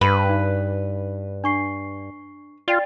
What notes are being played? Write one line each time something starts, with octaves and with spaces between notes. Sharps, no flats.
G2 B4
D#4
D4 C#6 C7
F4 D5 G5 A6